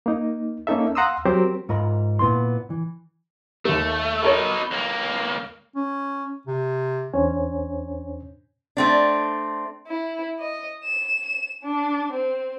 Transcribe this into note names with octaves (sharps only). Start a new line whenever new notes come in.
A#3 D#4
A#3 C#4 D#4 A4 E5
F5 F#5 A#5 C6 D#6 E6
F#3 C4 F#4 G4 A#4 C5
G#2 F4 A#4 B5
A#2 B3 E4 C6
E3
D#2 A3 A#3
B2 D#4 A4 A#4 C#5
C#2 A#3
C#4
C3
E2 C#4 D4 C5 C#5 G#5
A3 C4 D4
E4
D#5
E7
E7
D4
C4